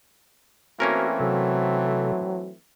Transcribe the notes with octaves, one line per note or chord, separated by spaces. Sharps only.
E3 A3 A#3 C4 C#4 F#4 A#4
C3 F#3 A4